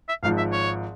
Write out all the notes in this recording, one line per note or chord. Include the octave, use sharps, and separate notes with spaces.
E5
G#1 G#2 F3 F5
E5
C#5